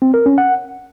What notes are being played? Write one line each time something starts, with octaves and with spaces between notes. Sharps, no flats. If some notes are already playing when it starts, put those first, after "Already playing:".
C4
A#4
C#4
F#5